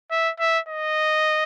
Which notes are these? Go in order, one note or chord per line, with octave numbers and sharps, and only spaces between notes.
E5
E5
D#5